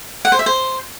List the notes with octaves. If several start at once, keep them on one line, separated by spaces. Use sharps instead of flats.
F#5
C5
E5
C5